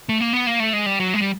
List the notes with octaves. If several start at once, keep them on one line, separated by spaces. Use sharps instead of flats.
A3
A#3
B3
A#3
A3
G#3
G3
F#3
G#3
G3